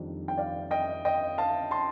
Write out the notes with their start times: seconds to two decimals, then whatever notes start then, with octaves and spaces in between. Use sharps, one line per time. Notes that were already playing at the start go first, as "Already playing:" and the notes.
Already playing: F2 D#3 G3 D4
0.28 G5
0.38 D5 F5
0.71 D#5 G5
1.05 D#5 G5
1.38 F5 A5
1.71 A5 C6